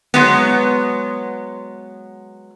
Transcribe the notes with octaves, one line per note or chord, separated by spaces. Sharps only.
F#3 G#3 B3